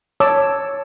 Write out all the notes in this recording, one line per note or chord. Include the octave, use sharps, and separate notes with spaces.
C#5 A5 D6 E6